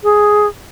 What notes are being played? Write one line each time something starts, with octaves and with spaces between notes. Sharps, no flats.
G#4